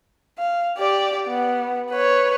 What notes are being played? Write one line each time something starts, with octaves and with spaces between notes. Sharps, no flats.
F5
G4 D5
B3
B4 C#5